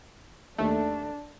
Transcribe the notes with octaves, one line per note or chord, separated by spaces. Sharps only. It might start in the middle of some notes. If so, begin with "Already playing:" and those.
D#2 A3 D4